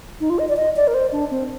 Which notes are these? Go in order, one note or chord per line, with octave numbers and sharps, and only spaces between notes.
D#4
F4
D#5
D5
D#5
D5
A#4
C5
D4
C4